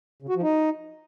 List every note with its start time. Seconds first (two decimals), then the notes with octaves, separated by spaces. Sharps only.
0.22 C#3
0.29 F#4
0.36 F3
0.42 D#4